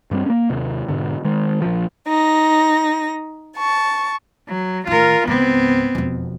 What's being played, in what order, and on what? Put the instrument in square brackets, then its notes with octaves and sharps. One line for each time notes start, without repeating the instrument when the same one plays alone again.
[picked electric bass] G2 G3 C4
A#3 C#4
D#2 C3
G#2 B2 D3
D#3 G#3
A#1 F3
[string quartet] D#4 A#6
A5 C#6
[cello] F#3
[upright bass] A2 D#3 [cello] F4 A#4
[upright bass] C#2 G#2 [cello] B3 C4
[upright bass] E1 F2